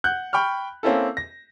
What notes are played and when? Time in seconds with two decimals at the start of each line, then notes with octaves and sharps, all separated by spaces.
0.04 F#5 F#6 G6
0.33 G5 B5 C#6 F6
0.83 A#3 C4 C#4 E4 A4
1.17 A#6